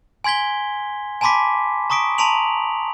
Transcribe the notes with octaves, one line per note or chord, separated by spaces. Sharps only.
G#5 C6 G#6 B6 G7
G#5 A5 B5 C6 D6 B6
A#5 C#6 D#6 B6 D7
A5 A#5 C6 D7 F7 F#7